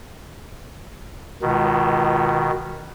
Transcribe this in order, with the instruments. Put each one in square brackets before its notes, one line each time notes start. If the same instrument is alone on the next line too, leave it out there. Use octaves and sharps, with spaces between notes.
[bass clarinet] C#2 [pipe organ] B2 D#3